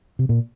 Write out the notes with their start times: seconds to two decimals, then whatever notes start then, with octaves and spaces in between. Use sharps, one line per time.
0.19 C3
0.29 A#2